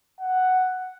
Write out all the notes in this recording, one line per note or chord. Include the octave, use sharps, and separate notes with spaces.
F#5